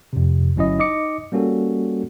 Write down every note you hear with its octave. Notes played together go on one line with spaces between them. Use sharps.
F2 C3
G1 F#3 C#4 E4 D#5
D#4 D#5 D6 C#7
G3 A#3 C#4 F#4 A4